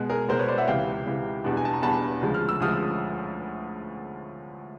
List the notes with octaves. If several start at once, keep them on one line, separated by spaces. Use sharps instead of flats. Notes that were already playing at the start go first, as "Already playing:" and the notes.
Already playing: B2 G#3 B3
G#4 A#4
B2 G#3 B3 A#4 C5
B4 C#5
C5 D5
E5 F#5
C#2 C3 E3 F5 G5
C#2 C3 E3
E2 B2 G3 B3 D4
G#5
A5
A#5
E2 B2 G3 B3 D4 A5 B5
D2 C#3 F3 G#3
F6
E6
D2 C#3 F3 G#3 D#6 F6